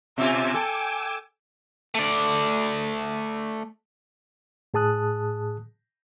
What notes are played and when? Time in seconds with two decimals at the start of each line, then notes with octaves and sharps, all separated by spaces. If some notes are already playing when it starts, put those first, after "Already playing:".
0.18 B2 F4 E5 G#5 D6 E6
0.54 A4 G5
1.95 A3 D5
4.74 A2 G#4 A5 D#6 F#6